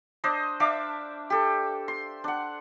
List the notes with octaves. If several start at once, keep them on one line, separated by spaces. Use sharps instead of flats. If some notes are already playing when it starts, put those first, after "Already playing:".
D4 C5 D#5
D4 E5 F5 D6
G4 A4
C6
D4 F#5